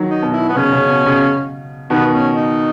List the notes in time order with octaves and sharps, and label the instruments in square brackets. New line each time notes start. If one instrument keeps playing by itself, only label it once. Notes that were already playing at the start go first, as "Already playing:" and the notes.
Already playing: [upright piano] D#3 F#3
[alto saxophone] D#4
[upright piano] B2
[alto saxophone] E4
B3
[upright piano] C#3 [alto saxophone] C#4
[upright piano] C#3
B2
C#3
[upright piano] B2 D#3 [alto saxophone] B3
[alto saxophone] C#4
D#4